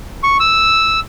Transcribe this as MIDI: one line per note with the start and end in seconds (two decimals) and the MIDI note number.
0.24 0.37 85
0.40 1.00 88